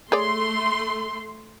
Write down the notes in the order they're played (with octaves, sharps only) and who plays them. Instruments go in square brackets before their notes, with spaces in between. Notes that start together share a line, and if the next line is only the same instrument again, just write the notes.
[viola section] A3 C6 [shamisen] G#4 C#5 D5